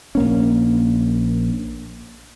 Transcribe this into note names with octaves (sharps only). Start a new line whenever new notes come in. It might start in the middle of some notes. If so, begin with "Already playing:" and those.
A#1 A#3 C#4